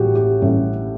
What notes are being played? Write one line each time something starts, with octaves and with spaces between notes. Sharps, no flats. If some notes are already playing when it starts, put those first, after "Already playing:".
Already playing: A1 A2 G3 F#4 G4
G4
A1 A2 G3